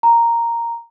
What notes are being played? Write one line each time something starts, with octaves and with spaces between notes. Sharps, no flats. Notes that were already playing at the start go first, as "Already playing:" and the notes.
A#5